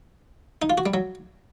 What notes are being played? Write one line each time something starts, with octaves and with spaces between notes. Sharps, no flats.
D#4
F4
F#4
G3
F#3